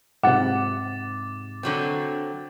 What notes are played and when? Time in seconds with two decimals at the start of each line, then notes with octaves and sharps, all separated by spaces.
0.23 G#2 C3 F#5 D6 A6
1.63 D3 F#3 C4